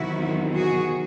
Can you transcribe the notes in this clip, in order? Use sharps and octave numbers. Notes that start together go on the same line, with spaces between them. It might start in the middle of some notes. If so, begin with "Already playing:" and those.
Already playing: E2 C3 D#3 F#3 E4 F#4
F#4 G#4